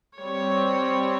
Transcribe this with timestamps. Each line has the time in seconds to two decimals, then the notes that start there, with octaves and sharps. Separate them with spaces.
0.19 G3 C4 C#5